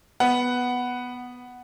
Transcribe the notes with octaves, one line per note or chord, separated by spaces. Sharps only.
B3 F#5